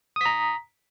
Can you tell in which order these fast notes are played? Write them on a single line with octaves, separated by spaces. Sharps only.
D#6 B6 A#5